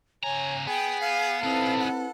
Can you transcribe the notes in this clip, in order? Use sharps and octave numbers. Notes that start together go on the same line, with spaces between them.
C#3 C#5 G#5 A#5
B3 G#4 G5
F5
B3 C4 D#4 E4 A4 B4
F#5